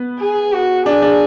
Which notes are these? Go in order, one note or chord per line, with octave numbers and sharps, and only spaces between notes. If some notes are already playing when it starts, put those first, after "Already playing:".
Already playing: B3
G#4
F#4
D4 G#4
D4